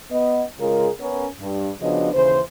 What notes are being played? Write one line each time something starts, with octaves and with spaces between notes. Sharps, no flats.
B3 D#5
C#3 G#3 F4 G#4 A#4
B3 C#4 A#4
G2
C#3 F3 B3 D4 F#4 D#5
D#2 C#3 E3 C5